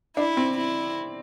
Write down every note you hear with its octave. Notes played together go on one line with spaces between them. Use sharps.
D4 E4
C4
E4